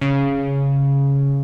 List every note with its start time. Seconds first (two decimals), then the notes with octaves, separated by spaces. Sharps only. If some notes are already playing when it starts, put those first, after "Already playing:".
0.01 C#3